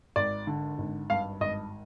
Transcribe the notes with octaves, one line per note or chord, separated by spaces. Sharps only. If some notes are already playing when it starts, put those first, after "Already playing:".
G#1 D5
D3
G#1
G2 F5
G#1 D#5